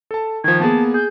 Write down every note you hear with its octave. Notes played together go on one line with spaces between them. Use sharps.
A4 A5
D#3 F3 G#6
A#3 B3 G#4 A5
G#4 G6